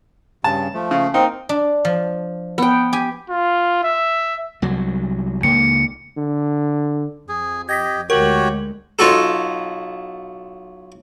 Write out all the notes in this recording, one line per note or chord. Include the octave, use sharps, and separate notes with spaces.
G2 C#3 A5
F3 A3
C#3
A#3 C4 D#4
D4
F3
B3 G5
G4 G#5
F4
E5
C2 F#3
C#2 A#3 C#7
D3
F2 G#4
G4 D#5 G#6 A#6 B6
D2 G#3 F#4 G4 A#4 C#5 F#7
B1 F4 F#4 A4